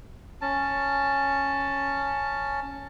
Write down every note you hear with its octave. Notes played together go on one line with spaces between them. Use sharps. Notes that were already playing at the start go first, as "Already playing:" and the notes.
C#4 A5